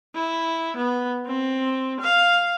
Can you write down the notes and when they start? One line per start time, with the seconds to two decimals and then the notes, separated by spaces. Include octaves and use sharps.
0.15 E4
0.76 B3
1.26 C4
2.01 F5